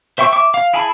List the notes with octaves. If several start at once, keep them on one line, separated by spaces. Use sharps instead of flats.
C5 E5 G5 C#6
E5 D6
F5
E4 G#4 G#5 A5 B5